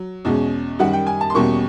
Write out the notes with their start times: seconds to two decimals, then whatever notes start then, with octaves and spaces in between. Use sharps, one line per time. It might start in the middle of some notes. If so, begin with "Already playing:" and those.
Already playing: F#3
0.25 E2 B2 G#3 C#4
0.79 F#2 D#3 G3 F#5
0.93 G5
1.07 G#5
1.21 A5
1.30 C6
1.34 E2 B2 G3 A#3 C#4 C#6